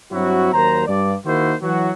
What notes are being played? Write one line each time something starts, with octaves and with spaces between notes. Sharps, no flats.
G2 F#3 C4 E4 F#4
D#2 F#3 A#4 C5 A#5
G2 D5
D#3 A#3 D#4 E4 F#4 C5
E3 F#3 F#4